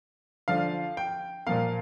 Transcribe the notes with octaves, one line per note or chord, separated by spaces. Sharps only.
D3 F3 D4 F5
G5
A#2 F3 A#3 F5